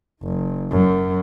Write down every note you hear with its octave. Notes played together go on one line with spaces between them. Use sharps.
F#1
F#2